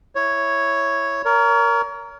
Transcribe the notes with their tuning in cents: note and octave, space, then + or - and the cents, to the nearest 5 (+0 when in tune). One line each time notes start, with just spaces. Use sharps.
E4 +0 C#5 +0
A#4 +0 C#5 +35